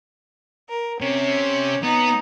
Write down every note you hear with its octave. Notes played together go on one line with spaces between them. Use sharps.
A#4
C3 C#4
B3 D#4